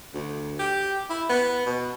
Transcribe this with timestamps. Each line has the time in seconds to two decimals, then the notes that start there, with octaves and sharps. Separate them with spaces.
0.14 D2
0.59 G4
1.10 E4
1.29 B3
1.66 B2